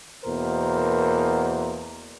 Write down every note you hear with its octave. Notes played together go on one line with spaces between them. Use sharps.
E2 B2 A#3 A#4 C5